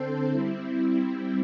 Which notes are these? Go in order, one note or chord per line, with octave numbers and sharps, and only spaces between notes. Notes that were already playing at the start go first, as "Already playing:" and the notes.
Already playing: D3 C4 A4 C5
G3 C4 E4